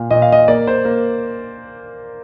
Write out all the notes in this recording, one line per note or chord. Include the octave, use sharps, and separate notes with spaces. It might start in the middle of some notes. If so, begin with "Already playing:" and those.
Already playing: A#2 F5
A#2 D#5
F5
D#5
A#3 D5
C5
A#3